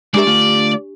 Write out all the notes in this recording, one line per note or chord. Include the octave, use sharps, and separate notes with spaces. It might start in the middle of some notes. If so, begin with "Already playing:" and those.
G#3 D4 G4 A#4 D5 E5
D3 A3 F4